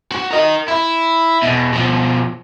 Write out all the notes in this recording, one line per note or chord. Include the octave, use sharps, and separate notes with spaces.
F#4
A#4 D#5
E4
E2 B2
B2 F3